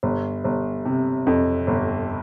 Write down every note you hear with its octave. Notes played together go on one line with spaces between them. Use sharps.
G1
G1
C3
F2
G1